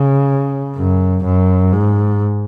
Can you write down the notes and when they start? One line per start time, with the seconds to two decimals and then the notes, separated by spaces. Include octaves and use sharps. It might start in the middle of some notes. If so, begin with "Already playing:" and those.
Already playing: C#3
0.77 F#2
1.25 F#2
1.72 G#2